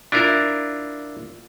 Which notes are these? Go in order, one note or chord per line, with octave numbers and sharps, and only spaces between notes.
D4 E4 F4 A#4